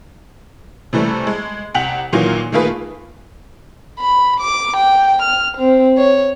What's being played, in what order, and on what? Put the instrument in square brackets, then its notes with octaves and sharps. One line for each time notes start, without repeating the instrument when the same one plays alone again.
[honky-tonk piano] C3 E3 G3 A3
G#3
C2 F#5 G5 B6 F7 F#7
A#2 D#3 E3 F#3 A#3 F4
D#3 A3 A#3 F4 G#4 B4
[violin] B5
D6
G5
F6
C4
C#5